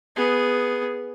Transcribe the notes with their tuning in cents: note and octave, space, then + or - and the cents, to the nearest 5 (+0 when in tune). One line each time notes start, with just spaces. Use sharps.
B3 +0 G#4 +0